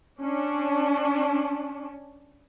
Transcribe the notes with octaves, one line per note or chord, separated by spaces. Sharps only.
C#4 D4